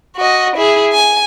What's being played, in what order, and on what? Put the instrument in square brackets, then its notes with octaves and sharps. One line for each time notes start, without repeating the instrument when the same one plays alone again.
[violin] F#4 D#5
E4 G#4
G#5